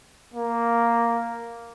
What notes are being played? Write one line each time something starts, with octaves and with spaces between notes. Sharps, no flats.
A#3